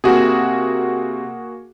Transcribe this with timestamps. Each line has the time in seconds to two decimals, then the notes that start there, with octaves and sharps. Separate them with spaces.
0.04 C3 A#3 F#4 G#4